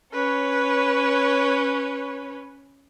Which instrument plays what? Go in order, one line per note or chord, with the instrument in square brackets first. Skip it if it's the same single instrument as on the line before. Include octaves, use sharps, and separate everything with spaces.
[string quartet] C#4 [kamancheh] B4 C#5